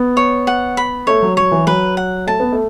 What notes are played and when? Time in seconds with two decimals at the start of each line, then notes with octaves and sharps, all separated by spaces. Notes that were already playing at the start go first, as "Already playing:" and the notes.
Already playing: B3
0.17 C#5
0.47 F#5
0.77 B5
1.07 A3 C#5
1.22 F#3
1.37 F#3 C#5
1.52 E3
1.67 F#3 B4
1.97 F#5
2.27 A3 A5
2.40 B3
2.52 A3